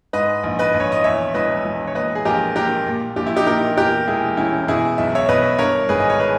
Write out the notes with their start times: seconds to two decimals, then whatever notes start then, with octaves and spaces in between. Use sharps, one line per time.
0.13 G#2 B4 D#5
0.44 A#1
0.59 B4 D#5
0.74 A#1
0.80 C#5
0.92 D#5
1.04 E2 C#5 E5
1.34 E1 B4 D#5
1.65 E1
1.87 C#5
1.95 A#2 B4 D#5
2.15 G#4
2.25 A#1 G4 A#4
2.56 A#2 G4 A#4
2.87 A#2
3.16 A#1 G4
3.27 E4
3.36 D#4 G4
3.46 A#2 G4 A#4
3.77 E2 G4 A#4
4.08 E1 E4 G#4
4.37 E1 C#4 E4
4.68 B2 E4 G#4
4.98 B1 E5
5.15 C#5 E5
5.29 B2 B4 D#5
5.59 G2 A#4 C#5
5.89 G#1 G#4 B4
6.00 D#5
6.10 C#5
6.19 G#4 B4